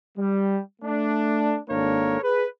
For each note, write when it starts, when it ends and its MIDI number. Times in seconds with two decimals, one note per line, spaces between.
0.18 0.59 55
0.82 1.58 57
0.82 1.58 62
1.70 2.19 32
1.70 2.19 58
1.70 2.19 62
1.70 2.19 69
1.70 2.19 70
1.70 2.19 73
2.21 2.45 68
2.21 2.45 71